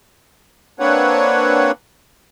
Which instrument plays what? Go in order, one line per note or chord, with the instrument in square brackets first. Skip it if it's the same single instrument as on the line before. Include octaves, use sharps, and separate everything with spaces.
[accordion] A#3 C4 D4 B4 C#5 F#5